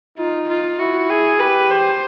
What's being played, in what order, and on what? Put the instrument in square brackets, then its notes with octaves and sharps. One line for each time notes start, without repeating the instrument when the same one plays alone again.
[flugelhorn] D#4 [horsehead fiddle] F4
[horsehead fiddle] F4
[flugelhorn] E4 [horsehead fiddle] F#4
[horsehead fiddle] G#4
[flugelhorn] G4 [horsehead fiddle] B4
[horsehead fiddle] C5